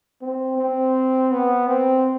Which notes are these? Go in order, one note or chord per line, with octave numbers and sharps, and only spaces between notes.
C4
C4
B3
C4